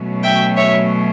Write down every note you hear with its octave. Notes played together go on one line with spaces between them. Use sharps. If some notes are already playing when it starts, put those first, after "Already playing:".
Already playing: B2 F#3 A3 C#4
E5 G5
C#5 E5